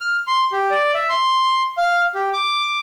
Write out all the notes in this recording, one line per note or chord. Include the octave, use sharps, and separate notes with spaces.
F6
C6
G4
D5
E5
C6
F5
G4
D6